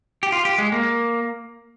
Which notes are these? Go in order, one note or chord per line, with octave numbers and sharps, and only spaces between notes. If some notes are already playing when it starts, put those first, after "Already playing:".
G4
F4
G4
G#3
A#3